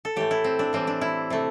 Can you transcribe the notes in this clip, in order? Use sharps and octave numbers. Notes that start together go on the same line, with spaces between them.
A4
A2 E3 A3 G4
E4
C4
D4
A2 E3 G3 C4
D4
E4
C3 A3